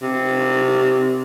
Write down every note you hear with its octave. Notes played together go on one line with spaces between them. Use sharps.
C3